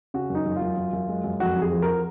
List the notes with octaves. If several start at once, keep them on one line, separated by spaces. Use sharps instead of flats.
C#3 F#4
F#2 D#4
F#2
F4
F#2
F#2
F#2
G#3
F#2
F2 F#4
F2
G#4
F3
A#4